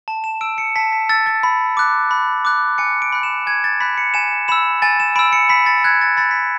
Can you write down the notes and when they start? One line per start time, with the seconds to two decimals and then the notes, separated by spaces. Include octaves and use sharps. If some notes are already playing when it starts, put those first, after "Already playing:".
0.08 A5
0.24 E7
0.41 E6 D7
0.58 C#7
0.76 A5 B6
0.92 B6
1.09 E6 A6
1.26 A6
1.43 B5
1.77 D6 F#6
2.11 B5
2.45 D6 F#6
2.78 G#5 C#7
3.02 D7
3.13 B5 F#6
3.23 E7
3.46 G#5 G#6
3.64 A6
3.80 B5 F#6 B6
3.98 C#7
4.14 G#5 E7
4.48 B5 E6 E7
4.82 G#5 A6
5.00 E7
5.16 B5 E6 D7
5.33 C#7
5.49 B5 B6
5.66 A6
5.84 F#6 G#6
6.01 A6
6.17 B5 A6
6.31 B6